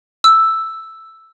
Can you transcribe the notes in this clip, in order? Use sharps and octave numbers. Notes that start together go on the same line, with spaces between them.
E6